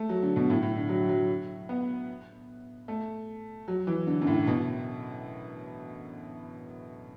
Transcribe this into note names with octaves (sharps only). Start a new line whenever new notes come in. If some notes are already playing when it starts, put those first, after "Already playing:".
Already playing: A3
F#3
D3
B2
A2
A2
D3
F#3
F#3
B3
A3
F#3
E3
D3
F#2
A2
B2